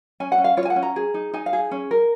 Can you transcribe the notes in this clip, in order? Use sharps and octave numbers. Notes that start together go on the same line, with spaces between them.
C#4 G#5
F#5
C#4
F5
F4 C#5
G#5
F#5
C#4
A#5
G#4
D#4
D#4 G#5
F5
G#4
C#4
A#4